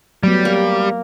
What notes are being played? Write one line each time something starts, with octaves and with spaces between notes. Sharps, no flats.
F#3 G3 A3 B3
A#3 G4